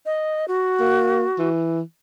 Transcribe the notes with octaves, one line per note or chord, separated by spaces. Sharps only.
D#5
F#4
A#3
E3